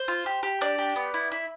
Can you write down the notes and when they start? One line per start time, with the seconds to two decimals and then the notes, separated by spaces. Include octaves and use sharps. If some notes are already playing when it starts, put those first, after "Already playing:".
Already playing: C5
0.08 F4
0.26 G4
0.43 G4
0.61 D4 D5
0.79 G4
0.96 B3
1.14 E4
1.32 E4